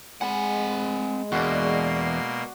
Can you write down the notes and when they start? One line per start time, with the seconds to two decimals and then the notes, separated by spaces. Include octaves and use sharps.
0.21 G#3 C4 F#5 G#5 B5
1.32 E2 B2 A#3 D4 F#4 C6